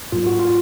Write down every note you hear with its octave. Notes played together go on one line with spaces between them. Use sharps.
G#2 F#3 A#3 F4
F#4
F4